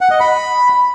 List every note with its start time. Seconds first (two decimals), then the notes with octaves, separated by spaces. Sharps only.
0.01 F#5
0.11 D#5
0.20 B5